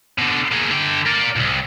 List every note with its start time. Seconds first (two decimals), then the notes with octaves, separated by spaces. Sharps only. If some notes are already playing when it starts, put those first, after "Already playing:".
0.18 B2 D3
0.51 A#3 G#4
0.70 D3 G5
1.06 A#4 D5
1.36 C2 B2